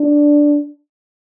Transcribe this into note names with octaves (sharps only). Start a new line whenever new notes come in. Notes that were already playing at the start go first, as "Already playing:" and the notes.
Already playing: D4